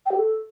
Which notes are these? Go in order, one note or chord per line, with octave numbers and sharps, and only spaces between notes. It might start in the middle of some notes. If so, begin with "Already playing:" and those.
G5
G4
A4